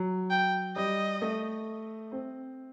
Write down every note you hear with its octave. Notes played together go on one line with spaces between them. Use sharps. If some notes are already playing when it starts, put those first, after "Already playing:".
Already playing: F#3
G5
G3 D#5
A3
C4